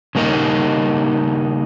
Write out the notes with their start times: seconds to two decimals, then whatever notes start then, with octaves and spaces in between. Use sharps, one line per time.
0.15 C#3 G3 A#3 D#4